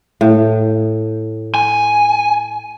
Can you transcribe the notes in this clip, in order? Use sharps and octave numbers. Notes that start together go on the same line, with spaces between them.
A2
G#5